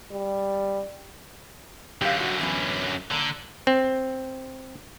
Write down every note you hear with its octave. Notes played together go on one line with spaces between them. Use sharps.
G3
F#2 D3 G4 F5
F#4
E3 B3 C#4
D3 A#3
C4